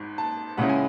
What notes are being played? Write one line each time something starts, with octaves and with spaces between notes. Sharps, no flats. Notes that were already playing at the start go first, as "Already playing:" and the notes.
Already playing: G#1 G#2
A5
C#2 C#3 G#3 C#4 E4 F#5
G#5